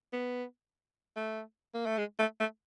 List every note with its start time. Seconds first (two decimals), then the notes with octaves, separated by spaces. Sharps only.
0.13 B3
1.16 A3
1.74 A#3
1.86 A3
1.98 G#3
2.19 A3
2.40 A3